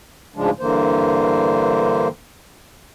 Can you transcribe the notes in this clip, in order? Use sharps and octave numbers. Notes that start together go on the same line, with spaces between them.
D2 G#2 C#3 F3 G#3 D4
G2 D3 E3 A#3 C5